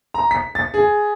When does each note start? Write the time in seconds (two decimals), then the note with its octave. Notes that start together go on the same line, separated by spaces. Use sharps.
0.14 A#5
0.31 B6
0.55 A6
0.74 G#4